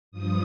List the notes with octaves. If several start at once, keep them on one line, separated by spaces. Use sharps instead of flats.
G2 F3 D#6